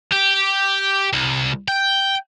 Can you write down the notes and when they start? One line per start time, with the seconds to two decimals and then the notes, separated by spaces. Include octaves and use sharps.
0.13 G4
1.13 C2
1.68 G5